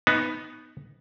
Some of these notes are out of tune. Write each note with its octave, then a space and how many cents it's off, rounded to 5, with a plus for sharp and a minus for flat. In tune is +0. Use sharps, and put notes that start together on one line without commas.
B3 +0 D#4 +0